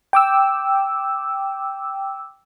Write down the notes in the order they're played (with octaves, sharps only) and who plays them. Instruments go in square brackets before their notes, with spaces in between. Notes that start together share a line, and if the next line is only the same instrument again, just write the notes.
[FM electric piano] G5 D6 E6